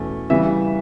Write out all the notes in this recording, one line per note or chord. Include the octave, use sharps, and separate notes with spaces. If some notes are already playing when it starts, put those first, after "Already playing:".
Already playing: E2 B2 A3 C#4
C#3 E3 G3 B3 E5